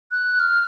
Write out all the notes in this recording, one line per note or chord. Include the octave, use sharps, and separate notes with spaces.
F#6
F6